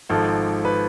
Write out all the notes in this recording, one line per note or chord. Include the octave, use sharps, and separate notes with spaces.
G#1 G#2 F3 A4
B4